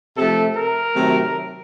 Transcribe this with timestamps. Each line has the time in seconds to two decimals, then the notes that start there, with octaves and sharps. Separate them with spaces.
0.17 C3 F3 A3 A4
0.57 A#4
0.95 C3 D#3 F#3 A3